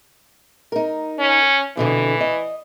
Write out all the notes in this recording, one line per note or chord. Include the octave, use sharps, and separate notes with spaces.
D#4 A#4
C#4
F2 B2 D3 E3
D#5